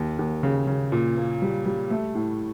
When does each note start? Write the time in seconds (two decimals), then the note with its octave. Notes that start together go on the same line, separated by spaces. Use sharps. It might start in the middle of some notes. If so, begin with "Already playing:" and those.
Already playing: D#2
0.19 D#2
0.43 C#3
0.67 C#3
0.92 A#2
1.17 A#3
1.42 G3
1.66 G3
1.90 A3
2.15 A2